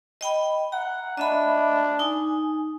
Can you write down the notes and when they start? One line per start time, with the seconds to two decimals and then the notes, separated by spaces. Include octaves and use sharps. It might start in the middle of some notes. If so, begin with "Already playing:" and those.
0.21 D#5 G5 B5
0.72 F#5 A#5
1.17 D4 D#5 E5 B5
1.99 D#4 G#5